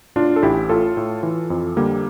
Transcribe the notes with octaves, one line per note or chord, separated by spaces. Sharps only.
A2 D4 F4
A4
A1 E4 G4
A2 F4 A4
A2
E3
F2
D3 G3 A#3